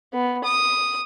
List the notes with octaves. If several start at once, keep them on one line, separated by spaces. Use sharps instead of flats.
B3
D#6